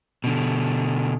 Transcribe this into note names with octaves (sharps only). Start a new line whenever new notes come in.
B2 D3